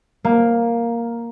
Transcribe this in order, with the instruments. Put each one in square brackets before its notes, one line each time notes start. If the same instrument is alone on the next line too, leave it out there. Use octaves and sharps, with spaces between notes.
[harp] A#3